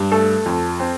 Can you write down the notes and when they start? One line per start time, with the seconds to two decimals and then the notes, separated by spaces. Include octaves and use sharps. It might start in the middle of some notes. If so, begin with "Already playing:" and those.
Already playing: G2
0.12 A3 A4
0.46 F2
0.80 C4